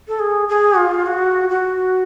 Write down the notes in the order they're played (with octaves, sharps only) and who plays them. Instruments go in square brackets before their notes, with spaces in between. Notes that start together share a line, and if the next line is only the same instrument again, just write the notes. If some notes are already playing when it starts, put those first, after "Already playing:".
[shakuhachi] A4
G#4
G#4
F4
F#4
F#4